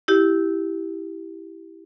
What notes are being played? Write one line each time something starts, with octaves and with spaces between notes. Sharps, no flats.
E4 G4